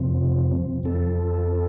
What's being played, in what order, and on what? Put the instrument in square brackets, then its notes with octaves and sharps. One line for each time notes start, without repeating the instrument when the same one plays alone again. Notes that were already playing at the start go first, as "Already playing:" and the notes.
Already playing: [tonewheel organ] F2 C3 F3 C4
F2 F3 C4 A4